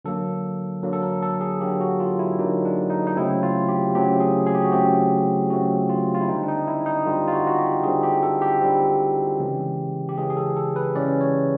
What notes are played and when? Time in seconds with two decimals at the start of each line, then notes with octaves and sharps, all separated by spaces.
0.05 D3 F#3 A#3 A4
0.83 D3 F#3 A#3
0.93 A4
1.02 A#4
1.22 A4
1.41 G#4
1.61 D3 F#3 A#3 G4
1.81 F#4
2.00 F4
2.19 E4
2.39 D3 F#3 A#3 D#4
2.65 D4
2.90 D#4
3.07 D#4
3.16 C#3 F#3 A3 C4 E4
3.43 F4
3.68 G4
3.95 C#3 F#3 A3 C4 G4
4.20 G#4
4.47 G#4
4.55 G4
4.64 F#4
4.72 C#3 F#3 A3 C4 G4
5.50 C#3 F#3 A3 C4 F#4
5.89 F4
6.15 F4
6.21 E4
6.28 D3 G3 C4 D#4
6.43 D4
6.48 D#4
6.67 E4
6.86 D#4
7.05 D3 G3 C4 F4
7.28 F4
7.32 F#4
7.47 F#4
7.59 G4
7.83 D3 G3 C4 G#4
8.03 G4
8.23 A4
8.42 G4
8.61 D3 G3 C4
9.40 C#3 E3 G#3 C#4
10.09 G4
10.18 C#3 E3 G#3 C#4 G#4
10.30 G#4
10.37 A4
10.56 A4
10.76 B4
10.95 C#3 E3 G#3 C#4 D5
11.21 C#5